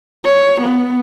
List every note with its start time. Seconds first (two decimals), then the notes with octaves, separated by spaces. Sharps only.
0.24 C#5
0.61 B3